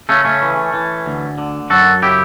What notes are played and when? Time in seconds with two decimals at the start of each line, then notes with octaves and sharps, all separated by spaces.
0.09 C#3 A3 C#4
0.25 A3 C#4
0.42 E3
0.74 E3
1.06 D2
1.38 D3
1.70 F#2 F#4 A4
2.02 C#3 E4 G4